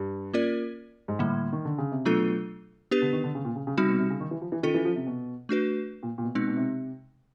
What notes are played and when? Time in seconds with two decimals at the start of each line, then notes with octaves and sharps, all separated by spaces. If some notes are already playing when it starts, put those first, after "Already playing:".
Already playing: G2
0.34 A#3 C#4 F4 A#4 D5
1.08 G#2
1.19 A2 D3 G3 A#3
1.52 D#3
1.65 D3
1.78 C#3
1.92 C3
2.05 B2 F#3 A3 D4 F4 A4
2.91 B3 D4 G4 B4
3.02 D3
3.12 D#3
3.24 D3
3.35 C#3
3.45 A#2
3.56 C#3
3.67 C#3
3.77 C3 G3 C4 D#4 F#4
3.89 B2
3.99 C3
4.10 C#3
4.20 D#3
4.31 E3
4.42 F3
4.52 E3
4.63 D#3 C#4 F4 A4
4.74 E3
4.85 F3
4.96 C3
5.07 B2
5.49 A3 D4 F#4 B4
6.03 A#2
6.18 A#2
6.24 B2
6.35 B2 G#3 C4 D#4
6.48 B2
6.57 C3